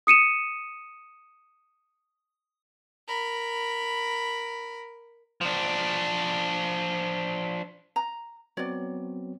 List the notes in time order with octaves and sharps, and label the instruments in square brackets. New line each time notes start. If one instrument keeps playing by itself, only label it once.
[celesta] D#6 C#7 D#7 E7
[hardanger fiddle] A#4 B5
[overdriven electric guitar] F3 D4
[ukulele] A#5
[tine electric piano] F#3 B3 C4 [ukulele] C#5 D5